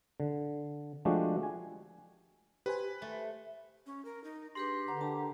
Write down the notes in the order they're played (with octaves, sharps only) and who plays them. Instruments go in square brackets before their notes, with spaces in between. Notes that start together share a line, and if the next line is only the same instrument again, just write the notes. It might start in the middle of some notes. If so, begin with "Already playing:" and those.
[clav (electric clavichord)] D3
F3 G#3 A3 D4 F#4 G4
G#5
[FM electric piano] G4 C5 G#5 [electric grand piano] B4
[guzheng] A3
[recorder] C#4
A#4
D#4
[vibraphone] D4 G#4 B4 [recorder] G4 [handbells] C6 A#6 C7
[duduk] D3 [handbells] B4 F#5 A#5 [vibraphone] D6
[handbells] D4 A#4 G5 [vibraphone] A5 A#5